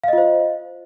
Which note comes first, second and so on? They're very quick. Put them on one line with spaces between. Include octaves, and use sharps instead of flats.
F5 D#5 F4 C5